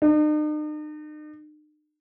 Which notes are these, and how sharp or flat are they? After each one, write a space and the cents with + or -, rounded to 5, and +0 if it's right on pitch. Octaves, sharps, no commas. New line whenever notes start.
D#4 -45